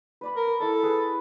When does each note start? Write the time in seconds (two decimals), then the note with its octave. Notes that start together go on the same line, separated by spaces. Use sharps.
0.21 B4 D5 B5
0.36 A#4
0.48 E6
0.60 E4 A4 D5
0.83 G#4 B4